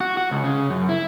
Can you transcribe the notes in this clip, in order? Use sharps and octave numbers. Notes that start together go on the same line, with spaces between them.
F#4
F#4
C#2
C#3
F#2
E4